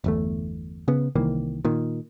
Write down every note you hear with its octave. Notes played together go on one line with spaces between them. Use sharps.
G1 E2 A3
C#3 B3
C2 D#3 E3 A#3
A#2 D#3